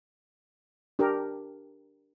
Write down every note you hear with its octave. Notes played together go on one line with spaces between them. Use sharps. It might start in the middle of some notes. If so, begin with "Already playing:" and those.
D4 G4 A#4